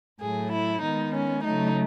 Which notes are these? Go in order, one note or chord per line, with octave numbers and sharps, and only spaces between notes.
A2 F#3 A3 G#4
E4
D#3 G#3 B3 D#4
C#4
C#3 F#3 A3 D#4